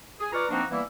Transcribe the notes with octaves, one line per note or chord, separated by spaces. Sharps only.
G#4
F4 B4 D5 A#5 C#6 F6
F3 A#3 C4 D4 D#4 F#4
E3 G3 A#3 B3 E4